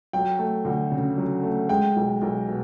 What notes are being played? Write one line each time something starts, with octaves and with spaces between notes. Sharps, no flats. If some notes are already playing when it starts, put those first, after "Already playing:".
F#3 G5
A3
D2
C#3
F#3
A3
G#3 G5
B1
B1
B2